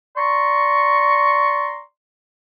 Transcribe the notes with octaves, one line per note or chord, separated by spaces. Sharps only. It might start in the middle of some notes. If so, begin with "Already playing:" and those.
D5 A#5 C6 C#6